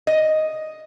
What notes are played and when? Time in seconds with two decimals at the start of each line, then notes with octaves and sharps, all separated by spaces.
0.07 D#5